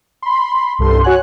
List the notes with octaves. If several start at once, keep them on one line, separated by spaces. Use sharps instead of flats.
B5 C6
C2 G2 A4 C6
F#4 C#5 F#5 G#5 F#6